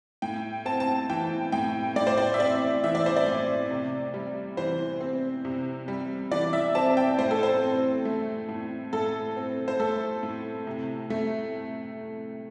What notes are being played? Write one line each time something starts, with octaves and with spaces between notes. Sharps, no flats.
A2 G5
C4 A5
A5
E3 G5
A2 G5
A2 D5
C5
D5
E5
C4 D5
E3 E5
D5
C5
D5
A2
C3
G3
E3 C5
C4
C3
G3
E3 D5
E5
C4 A5
G5
A2 C5
A4
C5
C4
A3
A2
A2 A4
C4
C5
A3 A4
A2
C3
A3